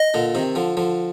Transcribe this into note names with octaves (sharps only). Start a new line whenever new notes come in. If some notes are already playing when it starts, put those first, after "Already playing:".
Already playing: D#5
A#2 D3
C3 D#3
D3 F3
D3 F3